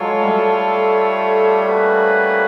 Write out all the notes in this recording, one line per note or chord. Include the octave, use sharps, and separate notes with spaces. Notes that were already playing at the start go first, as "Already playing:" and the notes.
Already playing: F#3 G#3 F4 A4 C#5
G3 A3
A#3 C#4 F#4 B4